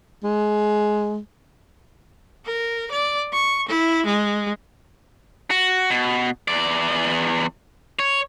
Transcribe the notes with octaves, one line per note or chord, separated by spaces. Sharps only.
G#3
A#4
D5
C#6
E4
G#3
F#4
B2
E2 D5
C#5